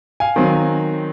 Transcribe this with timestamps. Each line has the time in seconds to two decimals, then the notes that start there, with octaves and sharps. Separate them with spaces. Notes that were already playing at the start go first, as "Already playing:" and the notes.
0.20 F5 G#5
0.36 D#3 F#3 C4